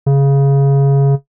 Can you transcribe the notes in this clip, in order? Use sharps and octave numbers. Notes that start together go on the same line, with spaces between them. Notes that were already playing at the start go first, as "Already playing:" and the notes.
C#3